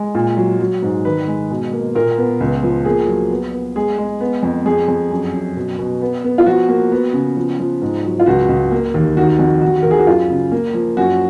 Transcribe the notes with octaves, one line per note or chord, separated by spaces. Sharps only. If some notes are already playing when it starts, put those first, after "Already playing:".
Already playing: G#3
A#2
F#3
F#3
G#2
D#3 B4
G#3
B2
A#3
A#2 A#4
B3
C#2
F3
A#3 G#4
F#3
B3
B3
G#3 G#4
G#3
B3
F2
F2 G#4
F2
F#2
F#2
B2
B2
B3
B3
F4
F3 F#4
A#3
B3
C#3
F3
F3
G#2
F#3
F4
C#2 F#4
C#2
A#3
D#2
D#3 F#4
F2 F#4
D#2 F#4
D#2 A#4
G#4
F#4
F#2 F4
C#3
A#3
F3
F#2 F#4